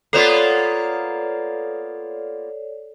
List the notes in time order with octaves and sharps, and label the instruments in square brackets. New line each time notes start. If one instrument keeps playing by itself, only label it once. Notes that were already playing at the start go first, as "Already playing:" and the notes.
[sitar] A#3 B3 F4 [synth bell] A4 C#5 D5